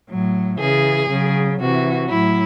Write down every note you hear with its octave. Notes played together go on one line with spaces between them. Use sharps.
A2 F#3
C#3 E3 G#4
C#3 F#3
C3 E3 F#4
A2 F#3 E4